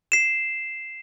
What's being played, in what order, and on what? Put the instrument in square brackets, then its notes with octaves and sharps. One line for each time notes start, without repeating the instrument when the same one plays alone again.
[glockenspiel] C7 E7